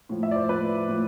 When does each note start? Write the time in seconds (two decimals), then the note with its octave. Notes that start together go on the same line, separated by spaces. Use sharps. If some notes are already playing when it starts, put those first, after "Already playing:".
0.09 A2 F3
0.23 E5
0.31 D5
0.36 C5
0.49 A2 F3 B4
0.89 A2 F3